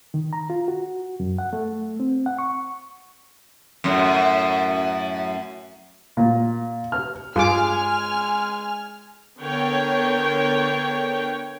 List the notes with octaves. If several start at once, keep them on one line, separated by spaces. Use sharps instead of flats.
D#3
A#5
F4
F#4
F#2
F#5
A3
C4
F#5
C#6
F#2 A2
A#2
F6
G2 G#3 F4 G#4 G#5 D6 F6
D3 B3 D4 A#4 C#5 G5